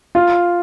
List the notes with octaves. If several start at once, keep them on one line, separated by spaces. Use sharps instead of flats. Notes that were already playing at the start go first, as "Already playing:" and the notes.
F4